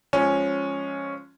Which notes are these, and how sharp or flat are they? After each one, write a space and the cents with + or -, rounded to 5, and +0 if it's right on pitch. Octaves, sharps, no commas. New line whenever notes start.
F3 +0 G#3 -5 C#4 +0